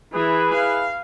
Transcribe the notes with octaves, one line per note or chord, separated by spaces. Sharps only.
E3 E4 G#4 B4
F5